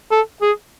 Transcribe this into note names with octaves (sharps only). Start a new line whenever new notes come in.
A4
G#4